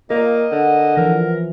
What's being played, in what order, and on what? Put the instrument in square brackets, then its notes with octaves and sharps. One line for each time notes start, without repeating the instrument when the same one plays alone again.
[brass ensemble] A#2 [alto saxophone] A#3 [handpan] A#4 [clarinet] D#5
[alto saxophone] D3 [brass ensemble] F#5
[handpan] E3 F3 [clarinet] A#4